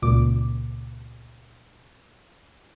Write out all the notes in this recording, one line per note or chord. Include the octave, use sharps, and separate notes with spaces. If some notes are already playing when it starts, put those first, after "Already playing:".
C#2 A#2 D6